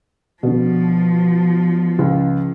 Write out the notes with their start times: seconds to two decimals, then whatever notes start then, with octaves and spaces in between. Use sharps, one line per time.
0.43 B2 D3 F3
1.99 C#2 C#3